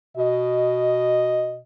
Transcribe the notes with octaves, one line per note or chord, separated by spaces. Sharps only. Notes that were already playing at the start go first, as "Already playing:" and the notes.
B2 D#5